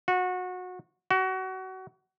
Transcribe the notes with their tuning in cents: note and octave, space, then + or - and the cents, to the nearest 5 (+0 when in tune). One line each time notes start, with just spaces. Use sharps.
F#4 -25
F#4 +25